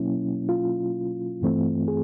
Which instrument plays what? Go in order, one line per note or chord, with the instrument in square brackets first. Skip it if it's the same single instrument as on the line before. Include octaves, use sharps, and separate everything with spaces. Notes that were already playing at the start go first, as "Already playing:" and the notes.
Already playing: [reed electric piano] B2 F#3 A#3 C#4 E4
F4
G2 E3 A3 C4
G#4